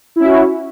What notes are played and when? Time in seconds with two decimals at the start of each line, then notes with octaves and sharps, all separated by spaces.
0.16 E4
0.20 C#4
0.24 F#4